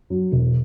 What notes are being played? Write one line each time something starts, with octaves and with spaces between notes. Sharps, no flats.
F#3
E1